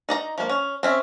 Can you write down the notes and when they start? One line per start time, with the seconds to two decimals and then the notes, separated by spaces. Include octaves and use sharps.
0.09 D#4 D5 A#5
0.38 F3 A#3
0.49 C#4
0.83 C4 C#4 E5